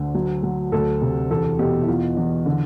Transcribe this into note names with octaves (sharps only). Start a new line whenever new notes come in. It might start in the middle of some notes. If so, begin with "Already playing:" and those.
Already playing: D2 D3
F#3
F#3
D2 A4
C3
E2 A4
B2 G4
E4
E2 F4
E2
D3